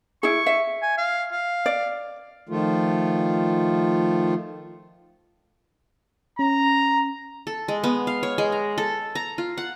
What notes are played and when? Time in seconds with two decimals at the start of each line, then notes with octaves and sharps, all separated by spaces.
0.23 E4 G#4 C#6
0.46 E5
0.82 G#5
0.98 F5
1.31 F5
1.66 D5
2.49 D#3 F3 A3 F4
6.39 C#4 A#5
7.47 A4
7.68 G#3
7.84 B3
8.07 F5
8.23 C#5
8.38 G#3
8.52 A#5
8.78 A4
9.15 A#5
9.38 F4
9.58 F#5